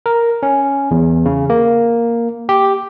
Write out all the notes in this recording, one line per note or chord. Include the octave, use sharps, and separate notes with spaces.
A#4
C#4
E2
C#3
A#3
G4